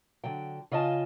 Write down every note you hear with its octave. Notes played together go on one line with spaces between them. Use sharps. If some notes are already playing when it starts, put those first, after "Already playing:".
D3 F#3 G5
C#3 F4 D#5 G#5 A5